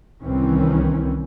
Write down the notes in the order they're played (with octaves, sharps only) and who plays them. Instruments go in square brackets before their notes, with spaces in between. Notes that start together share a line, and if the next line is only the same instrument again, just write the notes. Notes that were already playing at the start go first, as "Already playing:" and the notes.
[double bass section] C2 D#3 E3 C4 C#4